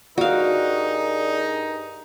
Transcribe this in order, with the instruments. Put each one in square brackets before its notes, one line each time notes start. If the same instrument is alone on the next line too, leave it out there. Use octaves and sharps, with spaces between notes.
[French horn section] G2 G#4 A#4 [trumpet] D#4 [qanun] F#4 F5 [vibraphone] D5